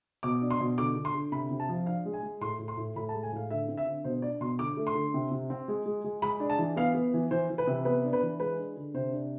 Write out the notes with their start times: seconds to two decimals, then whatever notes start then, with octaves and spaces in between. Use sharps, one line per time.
0.23 B2 D6
0.42 D4
0.51 C6
0.60 B2
0.78 D3 D6
0.96 D3
1.05 C6
1.15 D3
1.32 C3 B5
1.51 C3
1.60 A5
1.69 F3
1.86 D4 F5
2.05 G#3
2.13 G#5
2.23 G#3
2.41 A2 C6
2.59 A2
2.68 C6
2.77 A2
2.96 A2 B5
3.09 A5
3.13 G#3
3.23 G#5
3.32 A2 F5
3.50 D3 E5
3.68 C4
3.77 E5
3.86 D3
4.04 B2 C5
4.22 D4 D5
4.41 B2 C6
4.59 D3 D6
4.77 A3
4.87 C6
4.95 D3
5.14 C3
5.31 C3
5.50 C4
5.68 G#3
5.86 G#3
6.04 G#3
6.22 G#3 B5
6.40 D4
6.50 A5
6.58 E3
6.76 B3 F5
6.95 B3
7.14 E3
7.31 E3 C5
7.50 E3
7.58 B4
7.67 C3
7.85 B3 B4
8.04 D4
8.13 B4
8.23 E3
8.40 G#3 B4
8.58 D4
8.76 D3
8.94 C3 C5
9.12 D4